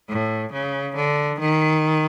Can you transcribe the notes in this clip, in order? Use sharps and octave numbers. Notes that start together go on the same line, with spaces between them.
A2
C#3
D3
D#3